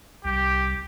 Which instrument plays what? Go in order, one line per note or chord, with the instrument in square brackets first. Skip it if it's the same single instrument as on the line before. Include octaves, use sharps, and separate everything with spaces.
[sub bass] C2 [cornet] G4